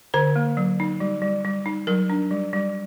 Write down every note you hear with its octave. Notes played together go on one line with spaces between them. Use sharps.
D3 C5
A#3
F#3
D#4
G3
G3
G3
D#4
F#3 A#4
D4
G3
G3